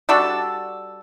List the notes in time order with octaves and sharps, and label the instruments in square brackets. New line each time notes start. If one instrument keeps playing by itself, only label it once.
[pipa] G3 D4 F#4 A4